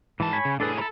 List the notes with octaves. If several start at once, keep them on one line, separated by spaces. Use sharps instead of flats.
G#2 E3 A5
C#5 G#5 B5
C#3
A2 D4 G#4 A4 B4
E4 A4 C#5 A#5 B5